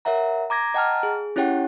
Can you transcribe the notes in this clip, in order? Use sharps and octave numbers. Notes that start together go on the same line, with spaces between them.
A#4 C#5 E5 F#5 A#5
A#5 D6 G#6 A#6
D#5 F#5 G5 A5 A#5 F6
G#4
C#4 E4 G4 C#5 F#5 G5